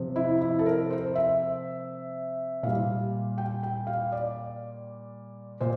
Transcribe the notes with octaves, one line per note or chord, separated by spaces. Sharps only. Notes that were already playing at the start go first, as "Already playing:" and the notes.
Already playing: C3 F3
E4
E4
A4
A#4
C5
E5
A#2 G3 F5
G5
G5
F5
D5
A#2 C5